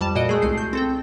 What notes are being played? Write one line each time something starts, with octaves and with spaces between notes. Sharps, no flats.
F2 G3 A5 E7
A#2 F#4 D#5 D7
G#3 A3 G#4
C2 A3 C7
G6
C4 A4 G5